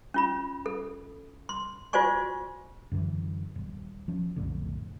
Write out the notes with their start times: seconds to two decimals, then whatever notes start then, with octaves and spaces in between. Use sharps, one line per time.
0.14 C#4 F4 B5
0.66 A4
1.49 C6
1.93 F4 F#4 C5 D5 G#5 C#6
2.92 F#2 D3 E3
3.56 D#1
4.08 F3 C#4
4.36 B1 F2 A2 D3